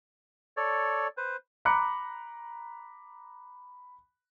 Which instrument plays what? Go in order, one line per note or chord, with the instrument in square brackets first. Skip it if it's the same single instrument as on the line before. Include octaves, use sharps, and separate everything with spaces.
[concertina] A4 C#5 D5
B4 C5
[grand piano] A#5 B5 D6 F#6 C#7